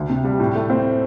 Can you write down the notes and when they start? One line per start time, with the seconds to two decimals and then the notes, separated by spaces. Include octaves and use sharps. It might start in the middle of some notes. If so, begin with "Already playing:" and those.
Already playing: D2
0.10 C3
0.24 G3
0.40 A2
0.55 A3
0.70 C4